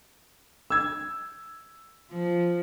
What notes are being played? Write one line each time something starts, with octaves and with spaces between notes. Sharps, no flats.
E6 G#6
F3